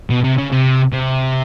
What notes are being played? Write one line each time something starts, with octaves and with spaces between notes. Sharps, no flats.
B2
C3
C#3
C3
C3